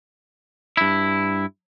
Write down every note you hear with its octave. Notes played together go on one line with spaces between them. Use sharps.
G2 E4